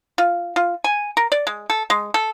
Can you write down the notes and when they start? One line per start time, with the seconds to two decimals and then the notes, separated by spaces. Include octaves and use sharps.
0.18 F4
0.56 F4
0.84 G#5
1.17 A#4
1.32 D5
1.47 G#3
1.70 A4
1.90 G#3
2.14 A4